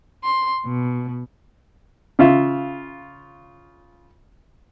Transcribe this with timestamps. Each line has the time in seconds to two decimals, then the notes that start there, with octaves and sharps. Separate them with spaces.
0.23 C6
0.65 B2
2.19 C#3 F4 E5